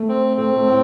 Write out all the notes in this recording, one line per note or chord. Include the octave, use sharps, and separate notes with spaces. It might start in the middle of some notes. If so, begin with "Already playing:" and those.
Already playing: A3
C4
A3 C4
A3
A2